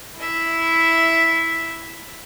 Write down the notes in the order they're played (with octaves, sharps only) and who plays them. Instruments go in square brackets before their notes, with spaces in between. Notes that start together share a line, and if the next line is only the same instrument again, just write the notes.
[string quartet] E4 E5